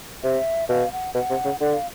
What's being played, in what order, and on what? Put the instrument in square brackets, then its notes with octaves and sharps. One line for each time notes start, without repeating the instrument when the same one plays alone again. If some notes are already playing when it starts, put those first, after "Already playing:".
[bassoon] C3 [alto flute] E5
[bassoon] B2 [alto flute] F5
[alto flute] F#5
[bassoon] B2 [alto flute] F#5
[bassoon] C3
C#3
[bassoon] D3 [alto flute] F#5
[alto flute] F5